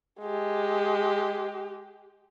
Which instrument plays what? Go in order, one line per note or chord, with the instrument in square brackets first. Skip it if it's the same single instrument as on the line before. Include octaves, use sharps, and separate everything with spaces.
[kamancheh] G#3 G4